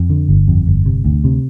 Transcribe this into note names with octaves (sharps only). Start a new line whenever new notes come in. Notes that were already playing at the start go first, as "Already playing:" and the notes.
Already playing: F2
D3
G1
F2
G1
C3
D2
C3